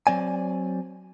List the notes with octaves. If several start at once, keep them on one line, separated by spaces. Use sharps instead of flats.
F#3 C4 D5 G#5